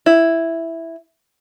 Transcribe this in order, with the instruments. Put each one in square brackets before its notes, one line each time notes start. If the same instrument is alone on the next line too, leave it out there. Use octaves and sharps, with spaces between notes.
[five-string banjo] E4